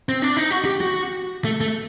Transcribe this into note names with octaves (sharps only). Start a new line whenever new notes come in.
C4
D4
D#4
F#4
G4
F#4
A3
A3